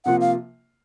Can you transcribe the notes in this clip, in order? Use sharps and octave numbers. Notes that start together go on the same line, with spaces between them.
C3 F3 A#3 F4 F#5
F5